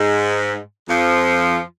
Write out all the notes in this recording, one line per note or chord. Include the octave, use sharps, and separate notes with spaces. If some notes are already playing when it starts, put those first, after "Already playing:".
Already playing: G#2
F2 F3